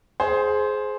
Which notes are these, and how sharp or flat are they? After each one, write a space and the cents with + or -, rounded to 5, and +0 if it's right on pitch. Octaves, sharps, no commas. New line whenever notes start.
G#4 +20 C5 +0